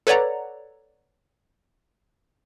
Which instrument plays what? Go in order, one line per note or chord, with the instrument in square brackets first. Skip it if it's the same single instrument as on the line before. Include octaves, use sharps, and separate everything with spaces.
[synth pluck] A4 B4 C#5 D5 F#5 A#5